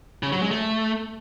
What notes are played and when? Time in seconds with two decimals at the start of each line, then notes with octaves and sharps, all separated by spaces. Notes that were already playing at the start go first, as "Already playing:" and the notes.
0.23 C#3
0.32 F#3
0.42 G#3
0.51 A3